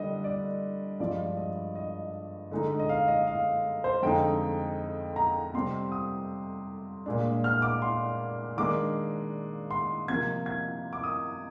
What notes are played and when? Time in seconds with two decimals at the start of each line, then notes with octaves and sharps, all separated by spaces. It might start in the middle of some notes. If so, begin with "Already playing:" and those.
Already playing: D3 G3 D4 D#5
0.24 D5
1.00 G2 F3 G#3 D5
1.37 D#5
1.75 D#5
2.51 D3 G#3 D#4
2.80 D#5
2.89 F5
3.08 D#5
3.27 F5
3.84 C5
4.02 F2 D3 G#3 D#4 G5
5.16 A#5
5.54 C3 G3 C4 C6
5.92 D#6
7.06 A#2 G#3 D4
7.44 F6
7.62 D6
7.82 C6
8.57 D#3 G#3 D4 D6
9.71 C6
10.08 C3 F3 A#3 G#6
10.46 G#6
10.93 D6
11.04 D#6